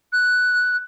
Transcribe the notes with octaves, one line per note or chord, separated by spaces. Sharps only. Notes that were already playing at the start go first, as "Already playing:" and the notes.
F#6